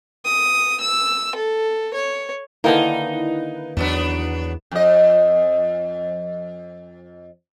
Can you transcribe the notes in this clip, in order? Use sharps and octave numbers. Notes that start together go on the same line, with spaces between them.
D#6
E6
A4
C#5
D3 D#3 A#3 D#4 E4 B4
E2 F#3 B3 D4
F2 D#5